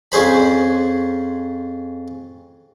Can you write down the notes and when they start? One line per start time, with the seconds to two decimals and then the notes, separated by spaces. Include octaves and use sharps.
0.12 F2 C#4 G#4 C5 B5